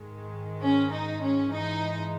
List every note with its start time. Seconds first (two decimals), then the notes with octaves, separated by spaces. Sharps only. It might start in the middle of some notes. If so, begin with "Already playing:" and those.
Already playing: G#2 D#3 G#3
0.61 C#4
0.92 D#4
1.23 C#4
1.53 G#2 E3 G#3 D#4